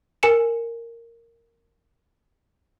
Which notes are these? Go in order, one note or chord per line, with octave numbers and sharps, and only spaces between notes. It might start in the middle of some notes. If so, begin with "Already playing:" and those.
A#4 G#5 C#7 E7